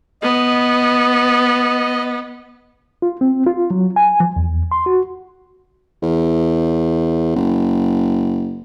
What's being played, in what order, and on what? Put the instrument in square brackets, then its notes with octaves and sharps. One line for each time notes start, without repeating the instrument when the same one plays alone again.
[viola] B3 [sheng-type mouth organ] D#5
[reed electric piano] F4
C4
F4
F#3
G#5
F3
E2
C6
F#4
[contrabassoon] E2
F#1